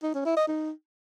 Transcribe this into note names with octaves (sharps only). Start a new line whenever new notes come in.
D#4
C#4
E4
D#5
D#4